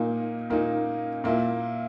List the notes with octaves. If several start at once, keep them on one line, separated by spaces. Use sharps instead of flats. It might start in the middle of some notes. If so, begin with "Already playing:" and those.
Already playing: A#2 A#3 D#4
A#2 A#3 D#4
A#2 A#3 E4